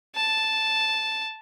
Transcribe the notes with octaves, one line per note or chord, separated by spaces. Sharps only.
A5